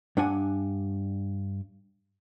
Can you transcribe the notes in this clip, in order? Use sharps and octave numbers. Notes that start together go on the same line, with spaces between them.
G2 D4 F#5 G#5